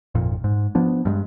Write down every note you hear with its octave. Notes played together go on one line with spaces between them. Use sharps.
G#1 F2 A#2
G#2
F3 B3 D4
G2 G3 G#3